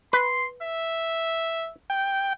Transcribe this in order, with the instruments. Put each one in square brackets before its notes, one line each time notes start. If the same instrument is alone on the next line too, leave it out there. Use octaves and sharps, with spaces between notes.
[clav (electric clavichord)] B4 [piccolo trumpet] C6
[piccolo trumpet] E5
[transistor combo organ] G5